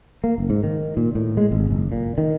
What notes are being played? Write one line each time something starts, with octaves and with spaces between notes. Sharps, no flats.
A#3
F#1
G#2
D#3
A#2
A2
G#3
G#1
F#1
A#2
D#3